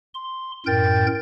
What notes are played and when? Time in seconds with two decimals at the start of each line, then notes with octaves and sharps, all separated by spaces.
0.14 C6
0.66 F#2 A2 A#4 G5 G6 A6